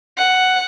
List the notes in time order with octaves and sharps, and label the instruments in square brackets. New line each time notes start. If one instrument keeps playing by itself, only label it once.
[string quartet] F#5